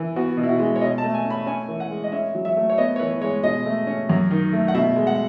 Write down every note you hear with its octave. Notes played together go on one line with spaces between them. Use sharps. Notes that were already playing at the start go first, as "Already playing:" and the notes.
Already playing: E3
B3 F#4
B2
E4
F#4
G#3
C#5
B2 D#5
A5
A3
G#5
C#4
B5
C#4 G#5
E3
F#5
G#3
D#5
C#4 E5
F#3
E5
A3
C#5
B3 D#5
C#5
E3 B4
G#3 C#5
B2 D#5
A3
C#4
F#2
D#3
A3
F#5
B2 E5
G#3
F#5